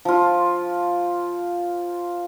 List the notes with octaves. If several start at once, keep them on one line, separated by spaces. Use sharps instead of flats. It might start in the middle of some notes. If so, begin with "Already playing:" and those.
F3 F4